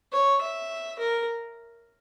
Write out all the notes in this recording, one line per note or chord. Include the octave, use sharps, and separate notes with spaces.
C#5
E5
A#4